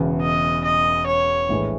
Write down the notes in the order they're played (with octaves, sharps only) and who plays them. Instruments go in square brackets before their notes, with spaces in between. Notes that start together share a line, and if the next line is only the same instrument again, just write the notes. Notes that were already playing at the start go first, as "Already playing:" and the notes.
Already playing: [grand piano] E1 E2 C#3
[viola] D#5
D#5
C#5
[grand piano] A#1 A2 E3 G#3